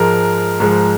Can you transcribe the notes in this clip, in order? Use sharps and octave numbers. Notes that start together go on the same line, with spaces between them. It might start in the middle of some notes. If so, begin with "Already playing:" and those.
Already playing: G#2 F3 G#3 A#4
G#2 F3 G#3